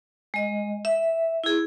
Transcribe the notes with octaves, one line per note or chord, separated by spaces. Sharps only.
G#3 D#5
E5
E4 G#4